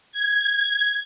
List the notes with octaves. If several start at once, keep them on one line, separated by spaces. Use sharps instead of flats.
G#6